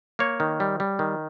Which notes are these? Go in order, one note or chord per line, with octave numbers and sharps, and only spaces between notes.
A#3 C#5
D#3
G3
G3
D#3